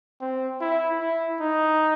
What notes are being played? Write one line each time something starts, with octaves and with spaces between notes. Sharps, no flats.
C4
E4
E4
D#4